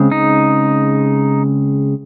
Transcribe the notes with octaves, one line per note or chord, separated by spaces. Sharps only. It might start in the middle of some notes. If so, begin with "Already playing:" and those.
Already playing: C#3 G#3 C4
D#4